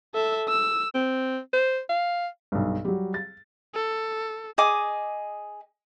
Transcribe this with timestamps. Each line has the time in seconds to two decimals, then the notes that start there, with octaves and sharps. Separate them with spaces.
0.14 A4 E5
0.48 E6
0.94 C4
1.53 C5
1.89 F5
2.52 B1 G2
2.85 F#3 G3
3.14 A6
3.74 A4
4.58 G#4 D#5 D6 D#6